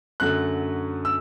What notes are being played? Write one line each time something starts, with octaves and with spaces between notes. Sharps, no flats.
F#2 D3 F#3 A3 F#6
E6